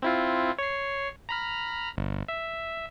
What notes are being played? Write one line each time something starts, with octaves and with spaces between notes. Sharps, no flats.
C4 E4 F4
C#5 C7
A#5 B5 F6
G1
E5